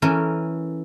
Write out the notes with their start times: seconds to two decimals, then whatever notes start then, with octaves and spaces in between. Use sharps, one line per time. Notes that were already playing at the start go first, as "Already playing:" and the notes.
0.02 E3 C#4 A4 A#4